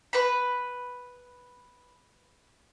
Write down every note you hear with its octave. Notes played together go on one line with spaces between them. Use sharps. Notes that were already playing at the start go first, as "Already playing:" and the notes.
B4 B5